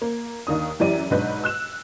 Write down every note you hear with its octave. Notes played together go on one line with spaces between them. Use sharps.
A#3
D#2 D#3 D4 D#6
F#2 E3 G4 D5 D#7
B1 G#2 D4 B4 G6
E6 F#6 E7